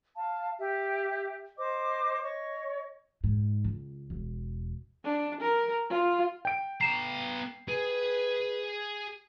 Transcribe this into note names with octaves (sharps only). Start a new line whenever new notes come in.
F5 A5
G4 E5 G5
C5 D#5 D6
C#5 D#5 C#6
G#2
C#2
E1
D4
A#4
F4
G5 D7
B3 A#5 C7 E7
G#4 B4